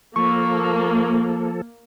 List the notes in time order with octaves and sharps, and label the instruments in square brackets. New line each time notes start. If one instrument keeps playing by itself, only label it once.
[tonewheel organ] F3 A4 [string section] A#3 [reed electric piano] C#6